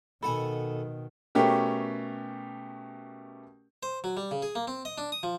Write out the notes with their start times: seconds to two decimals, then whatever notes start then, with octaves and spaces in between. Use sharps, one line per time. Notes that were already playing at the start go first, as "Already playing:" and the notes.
0.23 B2 D#3 A4 F#5 G#5 B5
1.35 B2 A3 C#4 G4 A#4
3.83 C5
4.04 F#3
4.17 G3
4.31 C#3
4.42 G#4
4.55 A#3
4.67 C4
4.85 D#5
4.98 D4
5.12 D#6
5.23 F3